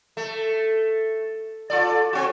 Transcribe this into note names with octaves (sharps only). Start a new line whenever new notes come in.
A3
F4 A4 D5
C4 F#4